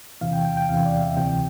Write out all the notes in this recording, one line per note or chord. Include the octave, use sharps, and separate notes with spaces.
E2 C3 E3 F5
G5
G5
G5
E2 C3 E3 F5
D5
E5
D2 C3 E3 G5